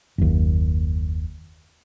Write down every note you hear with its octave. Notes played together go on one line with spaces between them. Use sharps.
F#1 D#2